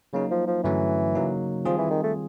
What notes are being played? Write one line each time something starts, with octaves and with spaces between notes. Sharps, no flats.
C#3 F#3 A#3 D#4
F3
F3
G2 D3 E3 F#3 A3 C#4
C#3 F#3 A#3 D#4
D#3 F3 G3 C4 F4 G#4
E3
D#3
A3